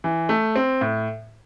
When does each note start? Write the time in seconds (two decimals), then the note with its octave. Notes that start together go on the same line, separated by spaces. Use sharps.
0.04 E3
0.29 A3
0.56 C4
0.81 A2